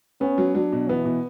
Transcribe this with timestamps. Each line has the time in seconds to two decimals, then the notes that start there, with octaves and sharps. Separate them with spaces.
0.21 B3 C#4
0.38 F#3
0.55 F#3 D4
0.72 B2
0.89 E3 B3
1.05 B2